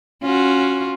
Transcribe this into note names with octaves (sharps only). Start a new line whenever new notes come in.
C#4 F4 F#4